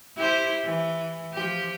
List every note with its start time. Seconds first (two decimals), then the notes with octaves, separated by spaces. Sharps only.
0.16 E4 G4 C5
0.64 E3
1.33 F3 G4